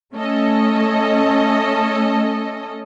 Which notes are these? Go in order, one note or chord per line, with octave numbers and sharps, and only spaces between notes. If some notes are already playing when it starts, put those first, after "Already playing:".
A3 C#4 A4 D#5